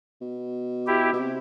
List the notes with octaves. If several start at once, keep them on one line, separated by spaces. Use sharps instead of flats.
B2
E4 G4
B2
C3